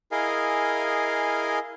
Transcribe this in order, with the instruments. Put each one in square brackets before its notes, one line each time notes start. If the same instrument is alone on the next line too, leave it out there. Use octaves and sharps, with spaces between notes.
[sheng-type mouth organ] E4 G#4 A#4 D#5 F5 G#5